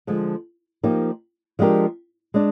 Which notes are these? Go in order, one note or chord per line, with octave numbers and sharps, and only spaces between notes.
D3 F3 G#3
F3 A#3 D#4 G4
F3 G#3 D4 G4 A#4
G#3 D4